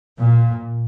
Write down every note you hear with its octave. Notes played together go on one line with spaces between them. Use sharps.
A#2